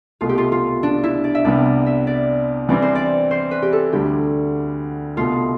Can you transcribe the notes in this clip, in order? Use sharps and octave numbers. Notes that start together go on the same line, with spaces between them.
C2 B2 A3 F4
G4
F4
F4
D4
E4
D5
E5
C2 C3 G3 B3 D5
D5
E5
D5
E3 G3 C4 D5
C5
D5
C5
B4
G4
A4
D2 D3 G3 G4
C2 B2 A3 F4